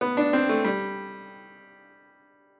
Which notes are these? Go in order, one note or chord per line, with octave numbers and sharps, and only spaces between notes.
B3
D4
C4
A3
G3